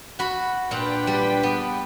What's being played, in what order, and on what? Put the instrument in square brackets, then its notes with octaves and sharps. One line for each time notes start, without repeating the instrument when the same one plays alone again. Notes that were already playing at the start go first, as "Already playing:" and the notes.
[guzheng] F#4 B5
[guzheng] A#2 F#5 [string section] D4 B4 G5
[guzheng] G3
B3